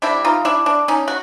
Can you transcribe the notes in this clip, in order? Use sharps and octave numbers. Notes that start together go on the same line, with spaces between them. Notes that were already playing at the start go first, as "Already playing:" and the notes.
D3 G3 C4 D4 E4
D#4 F4
D4 E4
D4
C#4 D#4
F#4